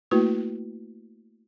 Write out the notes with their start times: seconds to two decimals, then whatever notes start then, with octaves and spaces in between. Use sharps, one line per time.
0.11 A3 A#3 E4 F#4 B4